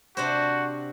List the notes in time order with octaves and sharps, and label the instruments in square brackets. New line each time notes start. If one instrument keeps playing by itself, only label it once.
[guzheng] C3 D4 C5 [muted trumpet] F#4